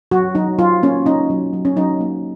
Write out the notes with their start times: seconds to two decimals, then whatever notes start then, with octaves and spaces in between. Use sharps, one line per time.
0.11 F#3 F#4
0.35 F#3 D#4
0.59 F#3 F4
0.83 A#3 C#4
1.06 C#4 D#4
1.30 F#3
1.53 F#3
1.65 C#4
1.76 F#3 D#4
2.01 A#3